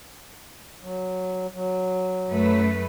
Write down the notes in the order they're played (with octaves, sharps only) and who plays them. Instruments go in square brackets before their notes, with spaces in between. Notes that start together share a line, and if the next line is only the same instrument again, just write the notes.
[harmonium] F#3
F#3
[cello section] F#2 A3 B4